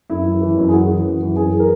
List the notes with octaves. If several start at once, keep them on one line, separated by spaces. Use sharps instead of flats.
F#2 E4
E3
E3
F#2
G#4
E3 F#4
E3
F#2
E3
F#2 G#4
A#4